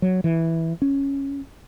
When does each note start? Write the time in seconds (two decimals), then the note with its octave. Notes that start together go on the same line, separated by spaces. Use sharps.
0.02 F#3
0.24 E3
0.82 C#4